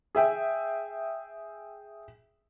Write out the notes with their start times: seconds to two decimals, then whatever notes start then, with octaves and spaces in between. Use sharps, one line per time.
0.15 G#4 E5 G5